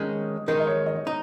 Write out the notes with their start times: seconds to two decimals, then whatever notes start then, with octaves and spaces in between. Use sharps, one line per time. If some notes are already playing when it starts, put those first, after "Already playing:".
Already playing: D#3 G#3 C#4 D#6
0.48 D#3 G#3 D#4 A#4
0.60 D#5
0.67 C#5
0.86 D#5
1.07 D#4